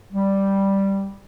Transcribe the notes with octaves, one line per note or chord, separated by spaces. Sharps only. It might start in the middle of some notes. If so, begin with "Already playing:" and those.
G3